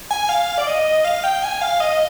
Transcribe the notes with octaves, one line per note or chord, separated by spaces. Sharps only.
G#5
F5
D5
D#5
F5
G5
G#5
F5
D#5